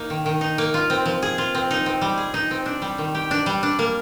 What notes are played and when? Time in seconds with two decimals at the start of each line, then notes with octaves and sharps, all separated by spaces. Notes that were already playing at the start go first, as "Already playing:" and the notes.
Already playing: A#3 D#4
0.10 D#3
0.26 D#3
0.41 D#4
0.58 A#3
0.74 F4
0.90 C4
1.06 F3
1.22 G#4
1.38 F4
1.55 C4
1.71 D#4
1.86 C4
2.01 G3
2.18 G#4
2.34 D#4
2.51 C4
2.66 D4
2.82 G3
2.98 D#3
3.15 G4
3.31 D4
3.46 G3
3.63 D4
3.79 A#3